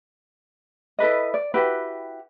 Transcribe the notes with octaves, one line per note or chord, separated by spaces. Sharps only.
E4 A4 B4 D#5
D5
E4 F#4 G4 B4